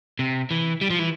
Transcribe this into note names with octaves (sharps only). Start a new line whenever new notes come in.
C3
E3
G3
F3
E3